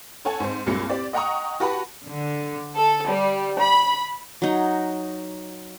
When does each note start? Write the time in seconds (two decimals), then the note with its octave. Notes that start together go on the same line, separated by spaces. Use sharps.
0.25 A4 C#5 F#5 G#5 A5
0.40 G#2 C4
0.66 C2 G2 A#2 F#3 G#3 C#7
0.89 C4 G4 D5
1.13 D#5 F#5 G5 A#5 C#6 D#6
1.60 F#4 G4 B4 F#5 A5 B5
2.05 D3
2.77 A4
3.08 G3
3.60 B5
4.42 F#3 D#4